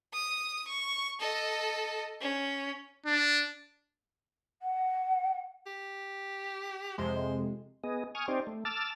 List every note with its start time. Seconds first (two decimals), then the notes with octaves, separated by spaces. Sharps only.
0.13 D#6
0.68 C#6
1.20 A4 D#5
2.21 C#4
3.06 D4
4.62 F#5
5.67 G4
6.98 F2 C3 G#3 C5
7.84 B3 G#4 D#5
8.15 G#5 C#6 D#6 F6
8.28 C4 D#4 G4 C5 D5
8.47 A3
8.65 A5 D6 E6 F6 A6